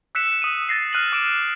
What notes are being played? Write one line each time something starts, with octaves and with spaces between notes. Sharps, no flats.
E6 F#6 B6 C#7 E7
D#6 D#7
A6 A#6 C7
F6 F#6 D#7 E7 F#7
D6 D7 E7